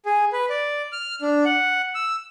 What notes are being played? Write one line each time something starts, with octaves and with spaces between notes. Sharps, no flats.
G#4
B4
D5
F6
D4
F#5
E6